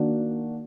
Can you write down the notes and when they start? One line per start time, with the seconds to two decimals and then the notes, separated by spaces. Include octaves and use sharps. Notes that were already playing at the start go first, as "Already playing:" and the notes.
Already playing: D#3 A#3 D4 F#4 D5